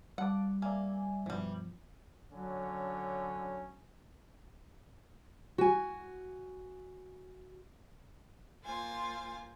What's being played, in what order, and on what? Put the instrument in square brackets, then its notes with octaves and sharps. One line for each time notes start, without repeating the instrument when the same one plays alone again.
[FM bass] G3 [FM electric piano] F5 A5 D6 [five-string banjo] F#5
[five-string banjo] A#3 [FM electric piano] D5 E5 G#5
[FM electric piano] G2 B2 [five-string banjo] E3 G3 [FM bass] F3
[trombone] D3 [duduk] F#3 [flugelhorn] C#4
[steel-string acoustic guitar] F#4 G#5
[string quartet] A#3 F4 C5 G#5 A6